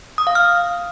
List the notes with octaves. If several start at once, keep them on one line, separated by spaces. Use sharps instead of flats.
D#6
F5
F6